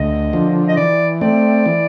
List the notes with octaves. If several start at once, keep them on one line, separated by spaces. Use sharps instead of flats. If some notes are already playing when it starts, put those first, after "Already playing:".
Already playing: D2 D#5
D3 F3
D#5
E3 D5
A3 C4 D5
E3